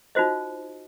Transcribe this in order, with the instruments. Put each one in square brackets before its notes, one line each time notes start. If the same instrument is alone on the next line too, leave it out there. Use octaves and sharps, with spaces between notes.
[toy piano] D#4 F4 F#4 C5 D#5